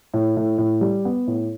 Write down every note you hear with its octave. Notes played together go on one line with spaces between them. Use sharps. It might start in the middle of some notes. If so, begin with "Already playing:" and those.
A2
A2
A2
G3
B3
A2